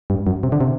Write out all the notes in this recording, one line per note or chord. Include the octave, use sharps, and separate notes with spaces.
G2
F#2
C3
D3
C3